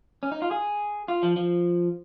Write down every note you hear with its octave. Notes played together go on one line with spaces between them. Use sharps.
C#4
D#4
F4
G#4
F4
F3
F3